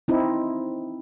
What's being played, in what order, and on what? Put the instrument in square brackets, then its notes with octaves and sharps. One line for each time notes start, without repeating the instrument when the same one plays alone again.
[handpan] C4 D#4 E4